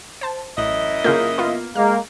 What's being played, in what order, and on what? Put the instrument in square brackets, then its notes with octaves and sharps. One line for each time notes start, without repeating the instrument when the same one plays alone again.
[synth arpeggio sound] C5 A5
[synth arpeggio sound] A1 [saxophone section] F#2 E4 D#5
[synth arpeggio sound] C#3 F4 G6 [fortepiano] A#3
[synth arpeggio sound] B3 F4
[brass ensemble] G#3 A#3 [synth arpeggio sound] F6